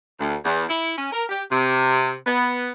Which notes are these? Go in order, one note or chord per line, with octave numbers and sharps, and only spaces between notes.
D2
E2
E4
C#4
A#4
G4
C3
B3